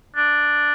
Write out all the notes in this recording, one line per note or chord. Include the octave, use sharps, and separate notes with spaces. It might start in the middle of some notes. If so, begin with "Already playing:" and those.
D4